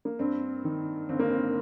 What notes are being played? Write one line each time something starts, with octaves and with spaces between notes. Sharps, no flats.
A#3
G2 C4
D#3
G1 C4
A#3
C4